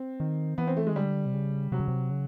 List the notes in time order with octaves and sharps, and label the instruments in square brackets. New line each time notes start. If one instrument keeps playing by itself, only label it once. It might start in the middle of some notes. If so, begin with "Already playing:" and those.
Already playing: [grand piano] C4
[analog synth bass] D#3
[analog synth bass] E3 [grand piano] B3
[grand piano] C4
A3
[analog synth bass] D#3 [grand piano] G#3
[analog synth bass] D3 [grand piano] G3
[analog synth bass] C3
C#3
[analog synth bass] C3 [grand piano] F#3
[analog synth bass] C#3
C3
C#3